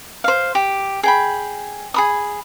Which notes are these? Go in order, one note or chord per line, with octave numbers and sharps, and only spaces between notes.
C5 F5
G4
G#4 G5 B5
G#4 B5 D#6